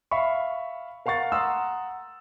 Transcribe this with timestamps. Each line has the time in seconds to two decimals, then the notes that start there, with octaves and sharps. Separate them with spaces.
0.11 E5 F5 B5 C#6
1.06 A#4 F5 F#5 C#6 A6
1.32 F#5 A#5 C6 D#6 E6